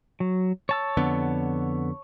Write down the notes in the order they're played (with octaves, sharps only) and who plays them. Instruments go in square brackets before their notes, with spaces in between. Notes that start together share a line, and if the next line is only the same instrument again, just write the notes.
[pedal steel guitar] F#3
C#5 A5 E6
[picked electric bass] F2 D3 B3